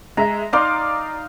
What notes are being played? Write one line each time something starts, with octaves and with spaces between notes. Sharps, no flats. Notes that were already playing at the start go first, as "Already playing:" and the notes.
G#3 E5 A#5
D#4 D5 F5 C6 D6 D#6